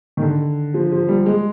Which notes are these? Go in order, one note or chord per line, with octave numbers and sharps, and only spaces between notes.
D#3
D3
F3
F3
G3
G#3